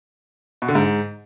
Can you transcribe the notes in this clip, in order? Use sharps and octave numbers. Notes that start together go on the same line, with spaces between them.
B2
D3
G#2